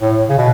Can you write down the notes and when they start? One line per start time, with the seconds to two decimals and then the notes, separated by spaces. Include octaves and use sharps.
0.02 A2
0.29 C#3
0.38 B2